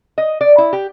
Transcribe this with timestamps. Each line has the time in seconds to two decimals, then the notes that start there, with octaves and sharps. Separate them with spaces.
0.18 D#5
0.41 D5
0.58 E4
0.73 G4